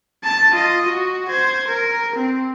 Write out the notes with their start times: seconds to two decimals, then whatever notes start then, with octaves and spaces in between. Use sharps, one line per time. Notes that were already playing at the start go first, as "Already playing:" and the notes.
0.24 A5 A6
0.54 F4 D#5
0.86 F#4
1.29 C5 G#6
1.67 A#4
2.16 C4